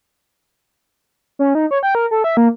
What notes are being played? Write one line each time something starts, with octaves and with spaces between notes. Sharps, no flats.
C#4
D#4
C#5
G5
A#4
A4
E5
A#3